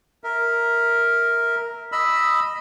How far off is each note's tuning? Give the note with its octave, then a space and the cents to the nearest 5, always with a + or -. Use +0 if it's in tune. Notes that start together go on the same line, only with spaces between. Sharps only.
A#4 +0 E5 -15
D#5 +0 B5 +0 E6 +0